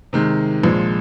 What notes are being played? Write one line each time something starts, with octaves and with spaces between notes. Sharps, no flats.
C3 D#3 G#3
A#1 A#2 F3 G#3